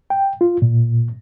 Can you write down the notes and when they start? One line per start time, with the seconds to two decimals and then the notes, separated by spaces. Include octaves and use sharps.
0.10 G5
0.41 F4
0.62 A#2